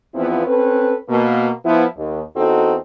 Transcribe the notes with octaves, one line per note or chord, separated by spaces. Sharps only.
E2 F3 B3 C4 E4 F4
C4 C#4 A4 B4
B2 A#3
F3 B3 E4
D#2
E2 C4 D#4 F#4 A4